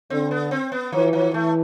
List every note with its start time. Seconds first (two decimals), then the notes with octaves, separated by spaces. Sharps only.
0.10 D3 C4
0.31 B3
0.51 C4
0.72 B3
0.92 E3 F3
1.13 F3
1.34 E3 A3